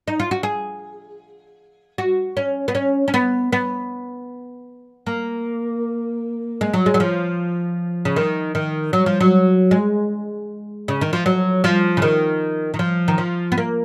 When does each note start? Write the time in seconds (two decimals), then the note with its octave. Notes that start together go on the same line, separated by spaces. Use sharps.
0.08 D#4
0.20 F4
0.31 F#4
0.43 G#4
1.98 F#4
2.37 C#4
2.68 B3
2.75 C#4
3.08 C#4
3.14 B3
3.52 B3
5.07 A#3
6.61 G#3
6.74 F#3
6.86 G#3
6.94 F#3
7.00 F3
8.05 C#3
8.16 D#3
8.55 D#3
8.93 F#3
9.06 F3
9.20 F#3
9.71 G#3
10.88 C#3
11.01 D#3
11.13 F3
11.26 F#3
11.64 F3
11.97 C#3
12.02 D#3
12.74 D#3
12.79 F3
13.08 D#3
13.18 F3
13.52 B3
13.58 A#3